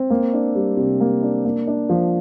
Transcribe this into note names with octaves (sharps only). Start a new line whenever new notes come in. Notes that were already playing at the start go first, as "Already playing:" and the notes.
Already playing: C4
A#3
D4
G3
C3
A#3
D4
A#3
D4
F3